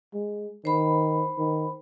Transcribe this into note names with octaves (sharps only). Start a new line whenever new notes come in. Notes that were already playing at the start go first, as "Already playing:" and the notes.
G#3
D#3 C5 B5
D#3